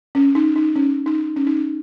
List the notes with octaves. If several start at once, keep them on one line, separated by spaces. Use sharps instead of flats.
C#4
D#4
D#4
C#4
D#4
C#4
D#4
C#4